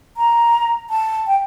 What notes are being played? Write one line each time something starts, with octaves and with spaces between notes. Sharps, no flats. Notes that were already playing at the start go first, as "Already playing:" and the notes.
A#5
A5
G5